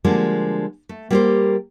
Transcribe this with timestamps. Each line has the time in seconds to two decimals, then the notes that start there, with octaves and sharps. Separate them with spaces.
0.04 D3 F3 G3 G#3 A#3 D4
0.89 A3
1.11 G3 A#3 B3 G4 A#4 C5